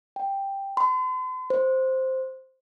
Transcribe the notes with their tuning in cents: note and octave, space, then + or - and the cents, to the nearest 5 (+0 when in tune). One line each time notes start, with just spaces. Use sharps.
G5 +5
C6 -45
C5 +0